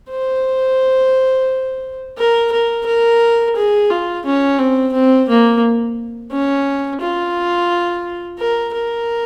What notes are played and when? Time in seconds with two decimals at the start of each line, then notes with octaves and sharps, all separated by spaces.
0.10 C5
2.18 A#4
2.52 A#4
2.86 A#4
3.56 G#4
3.90 F4
4.25 C#4
4.58 C4
4.93 C4
5.28 A#3
6.31 C#4
7.00 F4
8.39 A#4
8.73 A#4